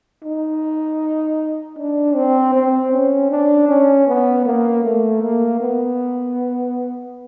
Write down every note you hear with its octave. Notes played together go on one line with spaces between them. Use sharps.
D#4
D4
C4
C4
C#4
D4
C#4
B3
A#3
A3
A#3
B3